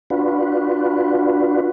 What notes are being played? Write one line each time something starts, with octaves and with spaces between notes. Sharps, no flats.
D4 F4 F#4 B4